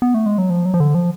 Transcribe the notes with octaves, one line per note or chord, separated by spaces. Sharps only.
B3
A3
G#3
F#3
F3
F#3
F3
D3
F3